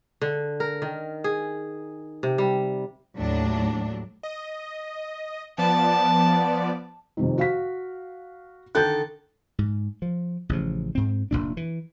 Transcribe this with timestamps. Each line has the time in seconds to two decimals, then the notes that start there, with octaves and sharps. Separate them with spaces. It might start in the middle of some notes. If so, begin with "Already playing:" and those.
0.21 D3
0.60 A#4
0.82 D#3
1.24 G#4
2.23 C3
2.38 G3
3.16 D#2 A2 F#3 D4
4.23 D#5
5.58 F3 B3 D5 A5
7.17 F2 C3 D#3
7.38 F#4 F5 B6
8.75 D3 D#3 A4 F#6 G6
9.59 G#2
10.02 F3
10.49 A1 C#3 F3
10.95 G#2 C4
11.31 F1 C2 A#2 D4
11.57 E3